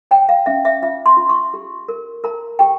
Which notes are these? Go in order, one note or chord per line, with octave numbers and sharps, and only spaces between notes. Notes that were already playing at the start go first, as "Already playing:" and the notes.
C#5 G5
F5
C#4 E5
E5
F4 E5
C6
F4
C#6
G4
A#4
A#4 A#5
G4 G5